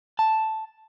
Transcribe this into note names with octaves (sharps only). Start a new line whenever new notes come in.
A5